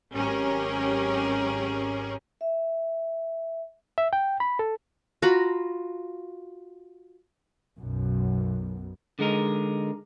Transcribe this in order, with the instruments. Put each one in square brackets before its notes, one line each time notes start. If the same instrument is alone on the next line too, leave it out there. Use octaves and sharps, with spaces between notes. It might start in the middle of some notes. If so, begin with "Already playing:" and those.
[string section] G#1 F#3 C#4 G4 G#4 A#4
[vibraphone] E5
[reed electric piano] E5
G5
B5
A4
[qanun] F4 F#4 A#5 B5
[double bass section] B1 F#2 B2
[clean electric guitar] D3 G#3 D#4 A#4